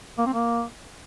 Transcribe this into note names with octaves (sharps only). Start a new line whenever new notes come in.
A#3
C4
A#3